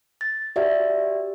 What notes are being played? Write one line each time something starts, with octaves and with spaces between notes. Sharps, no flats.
A6
F#4 G4 D5 E5